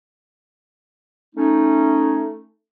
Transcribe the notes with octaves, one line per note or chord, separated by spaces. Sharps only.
A3 C#4 D#4